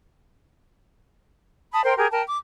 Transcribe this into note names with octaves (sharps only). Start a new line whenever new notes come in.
A5 B5 D#6
A#4 C5 G5 C6
G4 G#4 A#4
A#4 G5 A5
D6